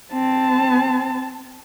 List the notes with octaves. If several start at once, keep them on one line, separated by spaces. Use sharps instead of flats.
C4 A5